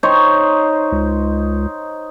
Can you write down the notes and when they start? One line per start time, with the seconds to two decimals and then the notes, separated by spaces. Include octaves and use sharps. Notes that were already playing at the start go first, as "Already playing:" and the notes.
0.03 D#4 C5 C#5
0.92 C#2